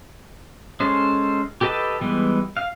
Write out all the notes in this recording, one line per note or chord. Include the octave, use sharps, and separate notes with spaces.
G#3 C#4 A4 C5
G4 A4 B4 D#5 A5
E3 G3 G#3 B3
F5